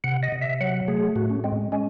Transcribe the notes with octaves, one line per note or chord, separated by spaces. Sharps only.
C3 F#5
D#5
C3
E5
F#3 F#5
A3 G#4
A2 F#4
C#4
G#3 C4
G#3 C#4